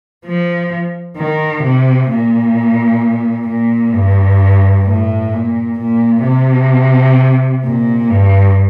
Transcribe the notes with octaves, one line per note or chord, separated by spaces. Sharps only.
F3
D#3
C3
A#2
A#2
G2
A2
A#2
A#2
C3
A#2
G2